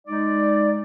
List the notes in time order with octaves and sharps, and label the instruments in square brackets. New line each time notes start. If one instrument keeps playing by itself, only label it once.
[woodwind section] G#3 D#4 D5